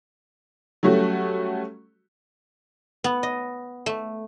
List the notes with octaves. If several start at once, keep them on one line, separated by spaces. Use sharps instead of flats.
F#3 G3 A3 C#4 F#4
B3
D#5
A3